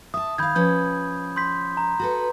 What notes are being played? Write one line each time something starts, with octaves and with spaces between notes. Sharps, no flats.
E5 A5 D#6
D#3 F5 B5 G6 G#6
F3 C#4 B4 G6
C6 G6 B6
A#5
F#4 A4 B4